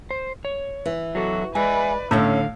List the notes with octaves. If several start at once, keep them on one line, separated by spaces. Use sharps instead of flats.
C5
C#5
E3
F#3 F#4 A4
G#3 B4 D5 E5 G#5
A2 D3 C#4 E4 E5 F5